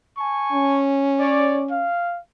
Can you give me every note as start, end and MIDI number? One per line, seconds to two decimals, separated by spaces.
0.18 0.82 80
0.18 0.82 81
0.18 0.82 85
0.52 1.87 61
1.20 1.62 73
1.20 1.62 74
1.71 2.18 77